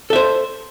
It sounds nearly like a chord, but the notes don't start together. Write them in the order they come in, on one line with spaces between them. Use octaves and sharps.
A4 E5 C5